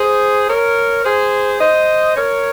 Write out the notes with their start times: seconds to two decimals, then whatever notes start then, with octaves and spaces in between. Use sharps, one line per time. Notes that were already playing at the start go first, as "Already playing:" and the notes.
Already playing: G#4 C5
0.49 A#4 C#5
1.05 G#4 C5
1.61 C5 D#5
2.16 A#4 C#5